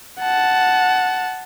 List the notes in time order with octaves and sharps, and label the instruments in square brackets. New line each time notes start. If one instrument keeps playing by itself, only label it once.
[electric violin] F#5 A5